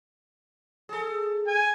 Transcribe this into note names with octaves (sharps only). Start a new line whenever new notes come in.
G#4 A4
G#5